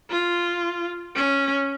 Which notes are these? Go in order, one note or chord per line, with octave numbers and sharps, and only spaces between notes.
F4
C#4